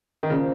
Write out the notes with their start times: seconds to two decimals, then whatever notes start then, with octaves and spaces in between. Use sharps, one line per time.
0.23 D#3
0.30 A#2 C#3 F3 A#3